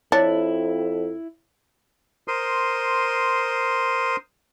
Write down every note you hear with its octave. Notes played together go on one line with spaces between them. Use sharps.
F2 D4 E4 C#5 A6
A#4 C5 C6 D#6